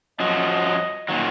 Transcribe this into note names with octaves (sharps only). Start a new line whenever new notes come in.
F#2 F3 F#3 D#5
A#2 D#3 F#3